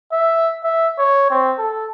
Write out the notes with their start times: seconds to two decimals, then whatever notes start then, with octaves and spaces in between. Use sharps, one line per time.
0.12 E5
0.64 E5
0.99 C#5
1.31 C4
1.59 A4